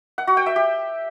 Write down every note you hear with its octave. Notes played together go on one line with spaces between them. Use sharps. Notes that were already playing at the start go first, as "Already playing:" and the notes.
F#5
F#4
G5
E5
G4